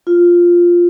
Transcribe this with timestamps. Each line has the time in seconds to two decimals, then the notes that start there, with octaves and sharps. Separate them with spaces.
0.07 F4